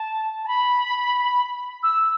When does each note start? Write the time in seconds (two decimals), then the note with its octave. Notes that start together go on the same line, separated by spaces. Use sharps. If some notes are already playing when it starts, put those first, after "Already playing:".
Already playing: A5
0.43 A5
0.48 B5
1.83 E6